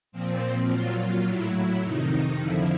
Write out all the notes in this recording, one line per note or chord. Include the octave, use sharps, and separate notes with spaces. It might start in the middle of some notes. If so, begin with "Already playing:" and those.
A#2 F3 C4
A#2 F#3 F4
A2 F#3 E4
F2 C3 D#3 D#4
F2 D3 F3 E4